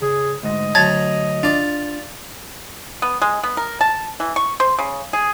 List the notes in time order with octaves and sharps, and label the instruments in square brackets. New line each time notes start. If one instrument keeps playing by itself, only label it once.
[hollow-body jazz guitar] C#3 [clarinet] G#4
[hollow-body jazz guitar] D2 G#2 [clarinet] D#5
[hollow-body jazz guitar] D2 A5 [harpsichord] F#3 A#5 [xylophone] G#6
[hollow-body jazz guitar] D4 [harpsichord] F4 D5
[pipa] B3
G#3
B3
A#4
A5
E3
C#6
C5
C#3
G#4